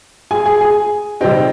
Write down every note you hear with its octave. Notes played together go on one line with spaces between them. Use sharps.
G#4 G#5
G#4 G#5
G#4 G#5
C3 G3 C4 D#4 G4 G5